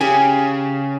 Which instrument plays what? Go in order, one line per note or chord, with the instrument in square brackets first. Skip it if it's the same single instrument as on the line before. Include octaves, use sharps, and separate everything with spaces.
[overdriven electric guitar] C#3 [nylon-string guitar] G4 G#4 G#5